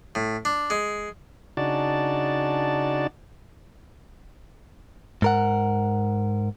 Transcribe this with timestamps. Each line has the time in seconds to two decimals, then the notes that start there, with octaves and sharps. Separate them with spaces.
0.15 A2
0.45 D4
0.70 G#3
1.57 C#3 D4 D#4 F#4 D5 A5
5.22 G#2 A#4 F#5